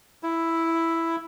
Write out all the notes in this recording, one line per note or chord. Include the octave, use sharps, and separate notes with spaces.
E4